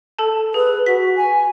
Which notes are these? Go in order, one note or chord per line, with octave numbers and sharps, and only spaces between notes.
A4 A5
G#4 B4
F#4 B6
G#5